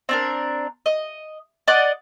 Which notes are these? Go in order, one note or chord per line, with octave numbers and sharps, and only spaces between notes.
C4 D4 A#4
D#5
D5 D#5 F#5 D6